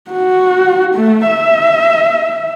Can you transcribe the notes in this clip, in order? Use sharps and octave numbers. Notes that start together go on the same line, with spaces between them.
F#4
A3
E5